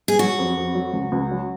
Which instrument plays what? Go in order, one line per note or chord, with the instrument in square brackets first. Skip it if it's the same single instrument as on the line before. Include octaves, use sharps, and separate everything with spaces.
[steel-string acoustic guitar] G#4
[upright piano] F#3 [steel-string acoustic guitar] F#4
[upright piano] F2
F2
F#3
C#2
C#2
F#3